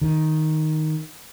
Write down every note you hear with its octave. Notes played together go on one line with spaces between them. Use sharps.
D#3